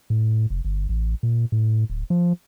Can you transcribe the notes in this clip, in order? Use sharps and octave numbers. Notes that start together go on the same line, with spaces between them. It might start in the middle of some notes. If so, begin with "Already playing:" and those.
A2
F1
G1
A1
A#2
A2
D1
F3